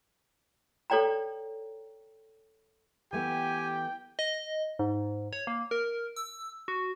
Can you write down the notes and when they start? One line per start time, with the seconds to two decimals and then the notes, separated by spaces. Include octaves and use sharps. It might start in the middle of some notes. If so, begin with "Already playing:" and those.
0.90 A4 C#5 D5 G5 A#5
3.13 E3 A3 B3 G4 G5 G#5
4.19 D#5
4.79 G#2
5.33 C#5
5.47 A#3
5.71 A#4
6.16 E6
6.68 F#4